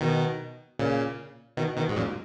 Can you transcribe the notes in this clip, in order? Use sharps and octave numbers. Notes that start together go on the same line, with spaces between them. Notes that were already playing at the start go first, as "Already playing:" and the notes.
B2 D#3
A#2 C#3
B2 D#3
B2 D#3
G#2
F#2 A#2